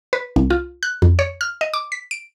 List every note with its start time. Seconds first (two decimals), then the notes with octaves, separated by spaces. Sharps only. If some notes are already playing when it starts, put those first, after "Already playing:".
0.13 B4
0.36 C2
0.50 F4
0.83 F#6
1.02 F2
1.19 C#5
1.41 F6
1.61 D#5
1.74 D6
1.92 B6
2.11 D7